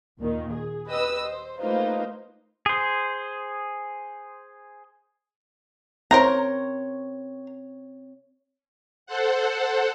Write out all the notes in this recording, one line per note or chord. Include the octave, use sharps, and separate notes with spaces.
D#2 A#2 D#3
G#4
G4 B4 D#5 D#6 E6
C5
A3 A#3 D#4 F4 B4 C5
G#4 C5
C4 A#4 C5 C#5 A#5
A4 C5 F#5